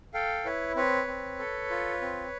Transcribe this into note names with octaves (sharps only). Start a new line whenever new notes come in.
A4 F5 G5
E4 B4 C#5
C4 B4 C#5
C4
A4
F4
C4